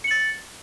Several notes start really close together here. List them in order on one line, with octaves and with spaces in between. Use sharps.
C#7 F#7 A6